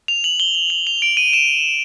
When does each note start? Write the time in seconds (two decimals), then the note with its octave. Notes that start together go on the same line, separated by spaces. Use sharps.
0.08 F7
0.24 F#7
0.40 G7
0.55 G7
0.70 F#7
0.87 F7
1.02 D7
1.17 D#7
1.33 E7